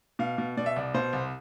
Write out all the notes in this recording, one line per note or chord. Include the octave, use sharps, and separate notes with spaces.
B2 F5
B2
B2 D5
E5
C2 D5
B2 C5
C2